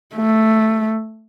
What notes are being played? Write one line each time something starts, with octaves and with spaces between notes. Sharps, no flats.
A3